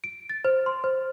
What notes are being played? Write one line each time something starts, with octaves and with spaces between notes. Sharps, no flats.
D7
A6
C5
C6
C5